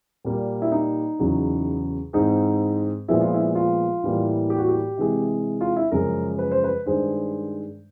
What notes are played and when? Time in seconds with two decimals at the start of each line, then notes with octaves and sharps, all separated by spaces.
0.25 A#2 G3 A#3
0.62 E4
0.72 D#4
1.19 E2 C#3 F#3
2.13 G#2 E3 G#3 C4 D#4
3.08 A#2 F3 G#3 B3 E4
3.21 F4
3.34 E4
3.55 F4
4.03 A2 E3 G3 A#3
4.50 G4
4.58 F#4
4.68 G4
4.98 C3 E3 G#3
5.61 F4
5.76 E4
5.92 F#2 C#3 F3 G#3 A#4
6.39 B4
6.51 C5
6.64 B4
6.86 G2 D#3 G#3 C5